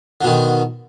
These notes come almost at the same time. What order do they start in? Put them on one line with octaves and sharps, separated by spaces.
D3 B2 D#3